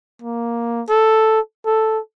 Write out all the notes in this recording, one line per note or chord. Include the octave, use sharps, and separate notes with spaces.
A#3
A4
A4